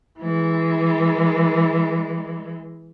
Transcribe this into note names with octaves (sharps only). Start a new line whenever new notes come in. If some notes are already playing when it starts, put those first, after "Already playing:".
E3 G#3